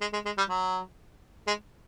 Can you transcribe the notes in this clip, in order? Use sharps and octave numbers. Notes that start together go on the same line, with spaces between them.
G#3
G#3
G#3
G3
F#3
G#3